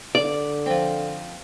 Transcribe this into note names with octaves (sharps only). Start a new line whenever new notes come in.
D3 D5
F3 C4